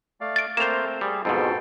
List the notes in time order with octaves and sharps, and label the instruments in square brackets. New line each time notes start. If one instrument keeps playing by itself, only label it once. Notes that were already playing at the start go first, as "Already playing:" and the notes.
[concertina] A3 D5 F5
[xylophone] A6 D7
[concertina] A3 C4 [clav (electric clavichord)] A#3 C5 [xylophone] E7 F7
[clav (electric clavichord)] G3 [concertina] G#4
[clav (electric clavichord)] F2 G#2 B2 [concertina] A4 G5 C6